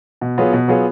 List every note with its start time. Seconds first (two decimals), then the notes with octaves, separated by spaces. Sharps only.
0.21 B2
0.38 F#3 B3 F4 G#4
0.53 B2
0.68 F#3 B3 F4 G#4